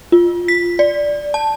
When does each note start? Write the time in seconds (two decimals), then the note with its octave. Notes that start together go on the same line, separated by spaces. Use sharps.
0.12 F4
0.48 B6
0.79 D5
1.34 A5